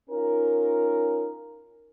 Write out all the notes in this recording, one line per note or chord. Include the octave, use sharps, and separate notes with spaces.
C#4 D#4 F4 A#4